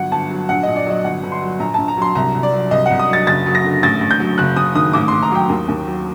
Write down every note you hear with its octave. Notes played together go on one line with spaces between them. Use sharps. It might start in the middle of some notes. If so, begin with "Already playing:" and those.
Already playing: G1 F#3 F#5
G1 A5
F#3
A#1 F#5
A#1 D#5
D5
F#3 D#5
G1 F#5
G1
C6
F#3
A#1 A#5
A#1 A5
A#5
F#3 C6
C2 A#5
C2
D5
F#3
C2 D#5
C2 F#5
D#6
F#3 A6
F#1 A6
F#3
A#6
D3
A1 A6
A1
G6
F#3
F#1 F#6
F#1 D#6
D#3 D#6
A1 D6
A1 C6
A#5
F#3 G5
D#2
D#2
F#3